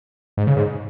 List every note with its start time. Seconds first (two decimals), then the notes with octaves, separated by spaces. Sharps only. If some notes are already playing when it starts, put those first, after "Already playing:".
0.37 G#2
0.47 C#3
0.56 G#2